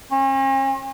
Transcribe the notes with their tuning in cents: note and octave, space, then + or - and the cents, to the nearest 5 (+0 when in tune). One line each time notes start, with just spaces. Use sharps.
C#4 -45